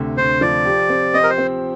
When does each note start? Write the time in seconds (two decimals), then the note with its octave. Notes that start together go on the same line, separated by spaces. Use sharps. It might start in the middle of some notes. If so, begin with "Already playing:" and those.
Already playing: D2 C3
0.17 D2 C5
0.41 F3 D5
0.65 G4
0.89 C4
1.14 C4 D#5
1.24 A#4
1.30 C5
1.38 C4